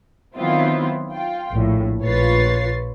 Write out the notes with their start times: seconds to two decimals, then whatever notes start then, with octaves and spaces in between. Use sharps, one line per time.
0.36 D#3 F#3 B3 C4 E4 F4
1.12 F4 G5
1.51 A#1 A2
2.02 A#1 F4 B4 C#5 A6 C7